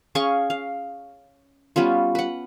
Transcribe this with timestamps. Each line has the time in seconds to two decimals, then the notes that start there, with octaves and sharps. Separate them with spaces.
0.15 C#4 G#4 F5 C#6
0.50 F5
1.76 G3 B3 C#4 F4
2.15 B4 F#5